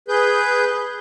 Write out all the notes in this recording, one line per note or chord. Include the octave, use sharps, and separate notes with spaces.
G#4 B4 G6